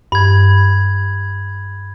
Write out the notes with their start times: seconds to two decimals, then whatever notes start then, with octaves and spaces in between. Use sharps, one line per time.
0.12 G2 B5 G#6